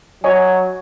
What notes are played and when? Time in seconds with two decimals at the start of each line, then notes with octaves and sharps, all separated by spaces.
0.24 F#3 C#5 D#5 G#5